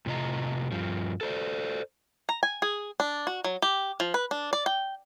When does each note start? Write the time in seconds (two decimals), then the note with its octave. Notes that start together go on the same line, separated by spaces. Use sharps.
0.06 A2 C3 F4 D#5 A#5
0.71 G2 F3
1.21 A4 C5 D5
2.29 A#5
2.43 G#5
2.62 G#4
3.00 D4
3.27 F#4
3.44 F#3
3.62 G4
4.00 F3
4.14 B4
4.31 D4
4.53 D5
4.66 G5